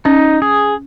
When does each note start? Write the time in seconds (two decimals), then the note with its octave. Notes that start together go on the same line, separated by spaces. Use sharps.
0.05 C#4 D#4
0.42 G#4